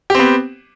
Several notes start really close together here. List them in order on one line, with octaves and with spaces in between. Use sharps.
G4 C4 B3